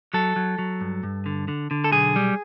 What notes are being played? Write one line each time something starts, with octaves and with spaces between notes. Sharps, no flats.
F#3 A4
F#3
F#3
G2
G2
D3
D3
D3
A4
B1 G#4
G3